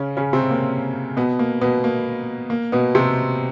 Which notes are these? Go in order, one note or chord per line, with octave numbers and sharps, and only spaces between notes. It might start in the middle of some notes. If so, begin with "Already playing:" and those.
Already playing: C#3 C#4
C#3 C#4
C3 C4
A#3
B2 B3
A#3
B2 B3
A#3
A#3
B2 B3
C3 C4